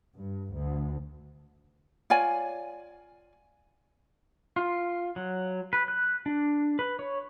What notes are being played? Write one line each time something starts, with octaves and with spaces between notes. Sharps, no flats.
G2
D2
F4 C#5 D5 G#5
F4
F#3
B4
F#6
D4
B4
C#5